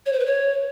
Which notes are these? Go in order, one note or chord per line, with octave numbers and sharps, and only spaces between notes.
C#5
C5
B4
C#5